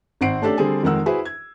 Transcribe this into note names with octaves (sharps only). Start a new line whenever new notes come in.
G#1 C4 F#5 C7 D7
A3 C#4 D4 G4 A4 D5
D3 G3 C4 G#4 A4
F2 D#3 G#3 A#4 F#5 E6
E4 F#4 G#4 B4 C5 E5
G#6